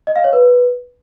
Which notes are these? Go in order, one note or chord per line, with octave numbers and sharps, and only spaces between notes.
D#5
F5
C#5
B4